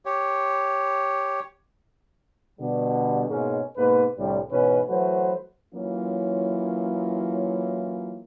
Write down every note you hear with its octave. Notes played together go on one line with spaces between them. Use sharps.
G4 C#5
B2 D3 G3
G#2 B2 G#3 A#3 C#4
G#2 B2 A#3 B4
C2 A2 D3 G3
G#2 B2 E3 C#4 B4
E3 F#3 A3 F#4 B4 C5
E3 F#3 A#3 C#4 E4 F4